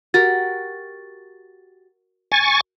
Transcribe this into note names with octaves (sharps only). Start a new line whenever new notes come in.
F#4 G4 A#4 A6
G#5 C#6 A6